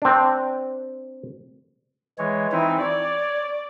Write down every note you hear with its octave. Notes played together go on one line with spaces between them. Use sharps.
C4 D4
E3 G#3 C#5
E3 C4 D#4 E4
C#5 D5